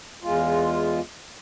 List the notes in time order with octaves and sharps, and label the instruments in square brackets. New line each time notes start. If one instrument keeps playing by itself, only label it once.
[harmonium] E2 G#3 F4